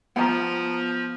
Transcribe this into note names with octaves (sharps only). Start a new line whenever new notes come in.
F3 B3 F#5 A#5